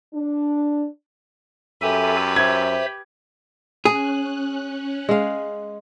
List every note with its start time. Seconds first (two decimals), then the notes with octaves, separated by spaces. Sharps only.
0.14 D4
1.82 F#2 G4 A4 B4 E5 G#5
2.36 C5 E5 G#6
3.85 C#4 G#4 F#6
5.09 G#3 F5